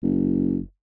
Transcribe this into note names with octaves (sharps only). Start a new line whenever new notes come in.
F#1